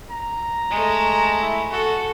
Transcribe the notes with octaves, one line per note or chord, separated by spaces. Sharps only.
A#5
G#3 A3
E4
F#4 A4